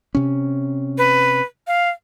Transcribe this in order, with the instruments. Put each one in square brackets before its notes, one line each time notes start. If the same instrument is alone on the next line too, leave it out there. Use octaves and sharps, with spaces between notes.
[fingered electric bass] C3 C#4
[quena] B4
F5